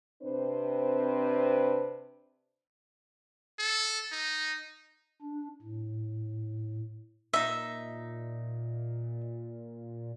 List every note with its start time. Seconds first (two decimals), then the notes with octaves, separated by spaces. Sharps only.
0.23 C3 C4 D4 B4 C5
3.59 A4
4.12 D#4
5.22 D4
5.62 A2
7.33 A#2 D#4 E5